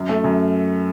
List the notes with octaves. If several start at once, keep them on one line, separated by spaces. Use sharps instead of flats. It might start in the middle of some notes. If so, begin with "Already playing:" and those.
Already playing: F#2
A3
F#2